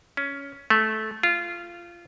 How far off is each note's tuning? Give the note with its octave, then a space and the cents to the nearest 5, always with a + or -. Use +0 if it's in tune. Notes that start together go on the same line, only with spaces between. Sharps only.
C#4 +10
A3 -15
F4 -15